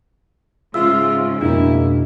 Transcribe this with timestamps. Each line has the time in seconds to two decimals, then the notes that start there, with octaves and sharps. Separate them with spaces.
0.74 G#2 C#3 F4 G#4 E5 E6
1.41 F2 B2 G#3 A#3 D4 E4